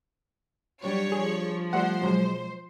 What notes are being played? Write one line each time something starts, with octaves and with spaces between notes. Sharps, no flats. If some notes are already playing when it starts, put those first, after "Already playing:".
F#3 G3 D4 C#5
F3 G#4
G3 A3 C5 F#5
B2 F#3 G#3